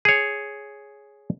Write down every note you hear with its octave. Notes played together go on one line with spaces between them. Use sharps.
G#4 C#5